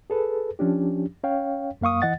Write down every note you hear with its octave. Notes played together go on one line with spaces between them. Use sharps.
G#4 A4 B4
F3 C#4 D4 G4
C#4 C#5 F5 G5
F#2 A#3 F5 C#6 D#6
E3 D#5 F#5 A6